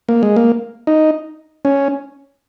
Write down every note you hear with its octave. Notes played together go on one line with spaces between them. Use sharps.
A#3
G#3
A#3
D#4
C#4